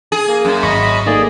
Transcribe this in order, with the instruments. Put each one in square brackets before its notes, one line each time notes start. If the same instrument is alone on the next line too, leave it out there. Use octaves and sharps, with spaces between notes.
[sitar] G#4
[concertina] A#3
[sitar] F#2
[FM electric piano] G#1 C#6 [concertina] D#5 B5
[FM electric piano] A3 A#3 D#4 [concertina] G#4 D5